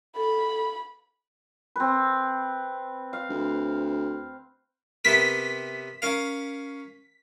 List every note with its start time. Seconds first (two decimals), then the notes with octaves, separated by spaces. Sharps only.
0.16 A4 B5
1.76 C4 B4
3.13 F5
3.29 D2
5.05 C3 B3 A#4 B6
6.02 C#4 A#4 F5